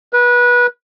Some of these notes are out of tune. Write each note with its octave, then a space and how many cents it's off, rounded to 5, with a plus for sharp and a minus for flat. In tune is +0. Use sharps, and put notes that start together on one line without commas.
B4 -25